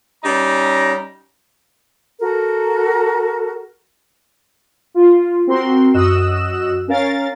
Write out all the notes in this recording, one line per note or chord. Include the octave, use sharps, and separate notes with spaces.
G3 C#4 D#4 A#5
F#4 A4 A#4
F4
C4 F#4 A#4 C6
F#2 F#4 D#5 E6 F#6 E7
C#4 A#4 F5 A6